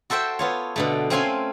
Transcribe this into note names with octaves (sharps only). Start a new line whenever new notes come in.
F#4 A4 C5 E5 G5
B3 F4 C#5
B2 D3 A3
A3 C4 C#4 F5 G#5 C6